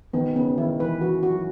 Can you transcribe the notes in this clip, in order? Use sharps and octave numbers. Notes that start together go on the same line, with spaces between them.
D#3 B3
C#3 B3
D#3 E4
E3 B4
E3 F#4
F#4
F#3